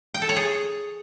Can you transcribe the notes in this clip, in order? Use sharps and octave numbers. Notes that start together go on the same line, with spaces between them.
G5
A4
C#5
G#4